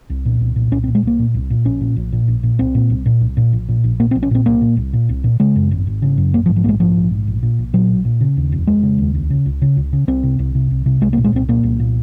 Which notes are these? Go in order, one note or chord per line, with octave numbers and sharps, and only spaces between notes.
C2
A#2
C2
A#2
C2 C#4
C4
A#2
G#3
C2 A#3
A#2
C2
A#2
A#1 C#4
A#2
A#1
A#2
A#1
A#2
C2 C4
A#2
C2
A#2
C2
A#2
A#1
A#2
A#1
A#2 A#3
C4
A#1
C#4
A#2 C4
C2 A#3
A#2
C2
A#2
C2
A#2
C#3 G#3
F#2
G#1
G#1
C#3
F#2
A#1 A#3
F3
G#2
F3
A#1 G#3 A#3
G#2 F3
A#1
G#2
A#1
A#2
A#1
A#2 F#3
A#1
A#2
C#3
D#2
F1
F1 G#3
C#3
D#2
C#2
C#3
C#2
C#3
C#2
C#3
C2 C4
C3
C2
C3
C2
C3
C2 G#3
A#3
A#2
G#3
C2 C4
A#2 A#3
C2
A#2